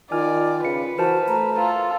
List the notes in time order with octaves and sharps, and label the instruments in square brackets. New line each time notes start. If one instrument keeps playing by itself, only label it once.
[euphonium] D#3 [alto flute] F4 [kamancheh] D5 [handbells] G#5 F6
[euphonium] C#3 [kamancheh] B4 [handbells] C#7
[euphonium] E3 [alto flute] F#4 [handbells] A#4 C5 A5
[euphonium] A3 [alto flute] A#5
[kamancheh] F4 A4